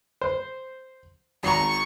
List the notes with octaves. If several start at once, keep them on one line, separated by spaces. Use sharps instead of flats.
C5
G#1 A#5 C#6